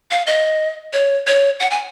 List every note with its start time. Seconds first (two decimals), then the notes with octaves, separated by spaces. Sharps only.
0.11 F5
0.27 D#5
0.93 C#5
1.27 C#5
1.60 F#5
1.71 G#5